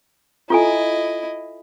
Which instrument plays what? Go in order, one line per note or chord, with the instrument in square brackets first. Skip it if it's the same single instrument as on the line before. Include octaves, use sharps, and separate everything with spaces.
[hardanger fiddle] E4 D#5 [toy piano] F4 A4 G#5